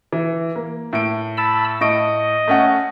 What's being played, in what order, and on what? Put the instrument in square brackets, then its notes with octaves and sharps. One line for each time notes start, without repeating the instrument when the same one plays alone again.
[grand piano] E3
A#3
A2 D7
[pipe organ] A5 B5 E6
[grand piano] A2 C#6 D7 [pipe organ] D#5
[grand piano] A3 C#4 F#5